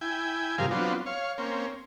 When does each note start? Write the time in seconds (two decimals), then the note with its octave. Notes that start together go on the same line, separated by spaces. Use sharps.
0.01 E4 G5 G#5
0.58 G2 C3 F3 G#4 A#4 F5
0.71 F#3 B3 C4 D4 F4
1.06 C#5 F5
1.38 A#3 C4 C#4